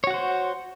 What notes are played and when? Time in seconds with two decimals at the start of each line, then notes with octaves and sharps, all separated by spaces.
0.04 C#5
0.07 F#4
0.11 F#5
0.14 C5